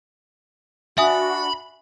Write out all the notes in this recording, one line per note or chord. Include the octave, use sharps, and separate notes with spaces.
D4 F#4 E5 G#5 B5 D#6